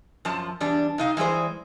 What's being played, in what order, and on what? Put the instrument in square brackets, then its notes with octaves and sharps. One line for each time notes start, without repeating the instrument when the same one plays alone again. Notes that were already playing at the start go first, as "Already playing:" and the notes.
[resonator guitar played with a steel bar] F#2 F3 A5
E2 G3 D4
C3 D#4 F5
E3 G3 G#3 G#4 C5